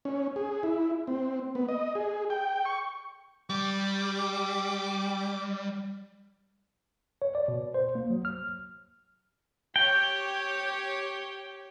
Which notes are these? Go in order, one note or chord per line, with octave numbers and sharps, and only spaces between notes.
C#4
G#4
E4
C4
B3
D#5
G#4
G5
C#6
G3 D6
C#5
D5
B2
C5
A#3
F#3
F6
G4 C#5 G5